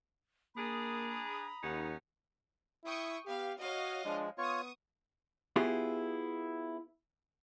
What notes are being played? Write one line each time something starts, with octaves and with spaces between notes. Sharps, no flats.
A#3 D4 G#4 A#5 B5 D#6
D#2 C#4 D#4 F#5
E4 G5 C#6 D#6
B3 G4 F5
F#4 C#5 D#5 F5
F3 G#3 D4
B3 F4 C#5 C#6 D#6
B3 E4 F4 G4 G#4